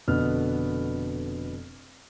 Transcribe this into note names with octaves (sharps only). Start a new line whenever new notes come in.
F1 B2 D3 B3 F6